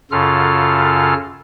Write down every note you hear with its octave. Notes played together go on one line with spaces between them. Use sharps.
F#2 C#3 F4 A4 F6